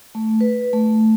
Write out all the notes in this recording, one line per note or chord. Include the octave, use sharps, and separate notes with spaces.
A3
B4
A3